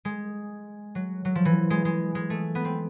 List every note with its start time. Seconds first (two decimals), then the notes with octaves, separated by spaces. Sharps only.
0.05 G#3
0.95 F#3
1.25 F#3
1.35 F3
1.45 E3
1.70 G#3
1.85 G#3
2.15 G#3
2.30 A3
2.55 B3
2.65 C4